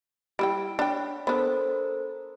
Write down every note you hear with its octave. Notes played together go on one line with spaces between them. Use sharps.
G3 E4 G5 D7
D4 C#5 G5 B5
B3 D4 A4 A#4 C5